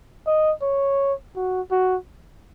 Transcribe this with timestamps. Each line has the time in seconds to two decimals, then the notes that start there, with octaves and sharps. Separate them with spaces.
0.27 D#5
0.62 C#5
1.36 F#4
1.71 F#4